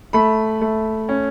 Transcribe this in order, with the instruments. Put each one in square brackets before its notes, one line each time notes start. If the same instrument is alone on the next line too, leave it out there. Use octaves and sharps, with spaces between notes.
[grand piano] A3 B5
A3
C#4